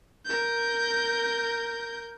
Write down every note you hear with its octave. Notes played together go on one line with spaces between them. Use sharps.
A#4 G6